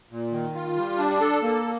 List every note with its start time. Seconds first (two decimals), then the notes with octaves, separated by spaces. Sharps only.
0.11 A#2
0.32 D#3
0.55 F4
0.77 G3
0.98 D4
1.21 A4
1.43 A#3